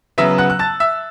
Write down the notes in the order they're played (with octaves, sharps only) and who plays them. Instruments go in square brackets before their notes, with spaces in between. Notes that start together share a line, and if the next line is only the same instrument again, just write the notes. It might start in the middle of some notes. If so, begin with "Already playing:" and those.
[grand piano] C#3 F#3 B3 E5 E6
F#5 F#6
F#6
A5 A6
E5 E6